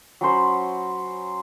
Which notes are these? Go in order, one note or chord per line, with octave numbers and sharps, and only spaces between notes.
F#3 C#4 C5 B5